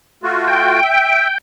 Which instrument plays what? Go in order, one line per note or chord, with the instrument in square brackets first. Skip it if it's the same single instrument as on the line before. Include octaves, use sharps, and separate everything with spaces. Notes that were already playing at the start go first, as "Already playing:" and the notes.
[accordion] A3 F4 F#4
[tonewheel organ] G5
[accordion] E5